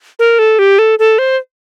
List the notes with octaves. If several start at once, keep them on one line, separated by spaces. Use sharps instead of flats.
A#4
A4
G4
A4
A4
C5